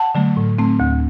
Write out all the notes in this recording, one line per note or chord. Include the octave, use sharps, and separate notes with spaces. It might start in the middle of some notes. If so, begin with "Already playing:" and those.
Already playing: F#5 A5
D3 F#3 A3
A2
A3 C4
D2